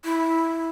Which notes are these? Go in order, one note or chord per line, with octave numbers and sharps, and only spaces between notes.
E4